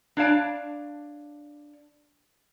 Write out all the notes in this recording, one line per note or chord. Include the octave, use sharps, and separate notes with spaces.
D4 C#5 D5 F5 A5